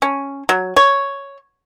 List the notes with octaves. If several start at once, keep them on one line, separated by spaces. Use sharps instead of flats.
C#4
F#3
C#5